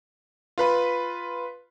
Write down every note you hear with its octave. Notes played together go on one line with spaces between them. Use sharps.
F4 B4 B5